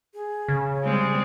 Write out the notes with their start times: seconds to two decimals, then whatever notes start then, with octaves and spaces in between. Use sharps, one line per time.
0.14 G#4
0.48 C#3
0.84 G3 G#3 C4